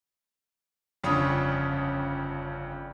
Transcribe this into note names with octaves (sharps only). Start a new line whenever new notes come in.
G1 F2 C#3 C#4 D4 D#6